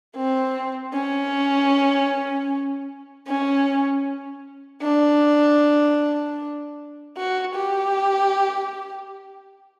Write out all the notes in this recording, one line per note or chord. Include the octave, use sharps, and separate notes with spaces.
C4
C#4
C#4
D4
F#4
G4